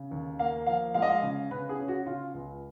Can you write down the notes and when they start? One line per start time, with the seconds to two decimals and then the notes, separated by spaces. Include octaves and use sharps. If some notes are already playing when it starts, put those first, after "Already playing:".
Already playing: C#3
0.11 D#2
0.39 A#3 F5
0.67 F3 F5
0.94 G#3 F5
1.02 D#5
1.10 F5
1.23 C#3
1.51 C#3 B4
1.69 G#4
1.79 C#4
1.88 F#4
2.06 C#3 F4
2.34 C#2